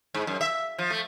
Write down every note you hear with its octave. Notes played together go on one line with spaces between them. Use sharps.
G#2
F#2
E5
F3
A3